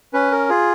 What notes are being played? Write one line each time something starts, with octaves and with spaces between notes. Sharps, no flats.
C#4 B4
A#4
F4 G#4